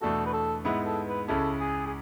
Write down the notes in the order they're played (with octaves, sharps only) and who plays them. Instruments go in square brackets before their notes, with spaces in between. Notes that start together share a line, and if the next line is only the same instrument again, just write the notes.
[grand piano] E2 B2 A3 D4 F#4 [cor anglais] A4
[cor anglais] B4
A4
[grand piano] G#2 G#3 B3 E4 [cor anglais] B4
[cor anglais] A4
B4
[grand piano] C#2 C#3 G#3 C#4 E4 [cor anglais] A4
[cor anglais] G#4
G#4